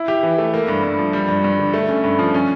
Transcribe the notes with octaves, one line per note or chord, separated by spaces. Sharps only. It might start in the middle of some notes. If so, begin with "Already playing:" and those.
Already playing: E4
G4
E3
A3
A#3
G2
G2
F3
G3
G2
G2
D3
A3
C#4
G2
F3
C#4